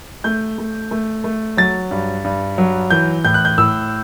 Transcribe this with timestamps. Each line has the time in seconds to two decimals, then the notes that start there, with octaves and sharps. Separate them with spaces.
0.24 A3 G6
0.58 A3
0.91 A3
1.24 A3
1.57 F#3 A6
1.91 G2
2.24 G2
2.58 F#3
2.90 E3 G6
3.25 A2 G6
3.34 F#6
3.45 G6
3.58 A2 E6